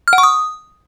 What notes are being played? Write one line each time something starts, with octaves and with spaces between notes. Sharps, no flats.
F6
F#5
C#6
D#6